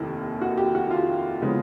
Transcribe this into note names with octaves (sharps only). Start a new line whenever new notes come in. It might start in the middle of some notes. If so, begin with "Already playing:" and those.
Already playing: F1 D#2 D#3 E4
F#4
G4
F#4
F4
C#3 F3 G#3 B3